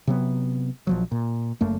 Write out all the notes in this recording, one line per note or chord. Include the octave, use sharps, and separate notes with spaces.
C3 F#3 B3
A#1 F3 F#3
A#2
F#1 F#2 A3 A#3